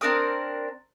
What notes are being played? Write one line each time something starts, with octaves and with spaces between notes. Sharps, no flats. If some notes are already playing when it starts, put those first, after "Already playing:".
C4 D4 A#4 D#6